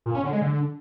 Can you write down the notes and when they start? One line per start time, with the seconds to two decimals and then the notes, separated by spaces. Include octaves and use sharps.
0.06 A#2
0.15 C#4
0.24 D3
0.33 G#3
0.41 D3